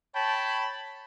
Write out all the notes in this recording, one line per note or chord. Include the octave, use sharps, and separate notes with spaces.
C#5 G5 A5 B5